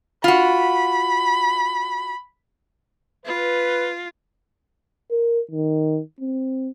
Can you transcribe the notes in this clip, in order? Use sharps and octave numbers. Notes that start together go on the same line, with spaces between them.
F4 F#4 B5
F4 B4
A#4
D#3
C4